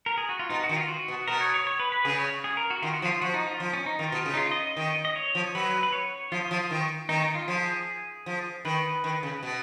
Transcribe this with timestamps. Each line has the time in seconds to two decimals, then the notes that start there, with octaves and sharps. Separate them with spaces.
0.06 A#4
0.18 G#4
0.29 F#4
0.39 F4
0.49 B2 D#4
0.64 F#4
0.69 D#3
0.76 F4
0.88 F#4
1.08 B2
1.28 B2 A#4
1.41 C#5
1.54 C#5
1.67 C#5
1.80 B4
1.92 B4
2.05 C#3 G#4
2.19 C#5
2.44 G#4
2.57 A#4
2.70 F#4
2.82 D#3 F4
2.93 F#4
3.02 F3
3.05 F4
3.21 F3 F#4
3.34 D#4
3.47 F4
3.60 F3
3.73 C#4
3.86 D#4
3.99 D#3 F4
4.12 B2
4.26 C#3
4.34 D#4
4.37 F4
4.51 D#5
4.64 D#5
4.77 D#3
5.05 D#5
5.16 C#5
5.35 F3
5.55 F#3 B4
5.83 B4
5.93 C#5
6.32 F3 F4
6.51 F3
6.71 D#3
7.09 D#3 D#4
7.22 D#4
7.35 F4
7.48 F3 G#4
8.26 F3
8.65 D#3 B4
9.04 D#3
9.23 C#3
9.43 B2